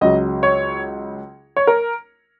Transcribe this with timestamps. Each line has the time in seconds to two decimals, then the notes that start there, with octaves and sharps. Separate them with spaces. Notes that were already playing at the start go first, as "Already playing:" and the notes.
0.01 C#2 C#3 F#3 D#5
0.43 C#5
1.57 C#5
1.67 A#4